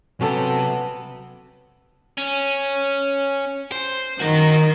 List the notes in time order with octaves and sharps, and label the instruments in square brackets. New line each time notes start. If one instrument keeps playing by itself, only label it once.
[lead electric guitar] C3 [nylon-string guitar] F#3 [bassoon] B3 [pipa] C#4 A4
[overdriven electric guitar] C#4
C5
[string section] D#3 [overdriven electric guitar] F#4 A#4